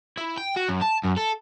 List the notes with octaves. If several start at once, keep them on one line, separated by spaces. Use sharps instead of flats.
E4
G5
F#4
F#2
A5
F#2
A4